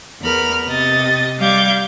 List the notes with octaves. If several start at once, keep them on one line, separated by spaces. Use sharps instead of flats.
E2 A#4 B5 F6
C3 D#5 A6
G3 F5 D6 G6 G#6